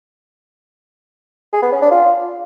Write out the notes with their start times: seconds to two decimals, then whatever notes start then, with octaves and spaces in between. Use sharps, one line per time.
1.53 G#4
1.63 B3
1.72 C#4
1.82 D4
1.91 F4